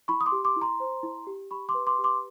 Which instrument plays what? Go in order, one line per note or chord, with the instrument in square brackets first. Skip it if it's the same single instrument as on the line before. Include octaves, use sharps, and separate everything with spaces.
[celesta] E4 B5 C#6
D#6
C6 D6
G4
C6 D6
E4
A#5 C6
C5
E4
G4
G4 B5 C#6
C6 D6
B4
C6 D6
G4
C6 D6